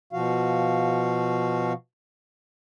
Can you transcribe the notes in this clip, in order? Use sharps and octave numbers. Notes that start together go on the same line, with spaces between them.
B2 F3 F#4 F5